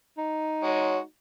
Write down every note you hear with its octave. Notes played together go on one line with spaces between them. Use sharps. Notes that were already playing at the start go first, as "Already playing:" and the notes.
D#4
G#3 F#4 C#5